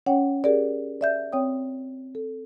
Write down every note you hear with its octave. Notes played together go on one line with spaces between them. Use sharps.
C#4 C#5 F#5 G5
G4 G#4 A#4 D5
D5 E5 G6
C4 C#5 G5 D#6
A4